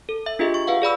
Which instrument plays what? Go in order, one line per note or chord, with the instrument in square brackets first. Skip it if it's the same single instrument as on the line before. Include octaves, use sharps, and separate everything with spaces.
[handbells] A4
E5
D4 F4 G4 G#4 D#5 E5
C#6
F4 B4 F5 F#5
G#4 D5 B5 E6